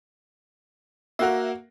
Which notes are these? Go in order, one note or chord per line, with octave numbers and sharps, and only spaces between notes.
A#3 F#4 A#4 E5 F#5